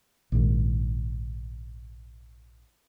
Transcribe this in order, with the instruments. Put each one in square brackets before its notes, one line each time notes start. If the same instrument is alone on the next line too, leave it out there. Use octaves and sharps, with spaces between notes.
[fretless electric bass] A#1 G#2 D#3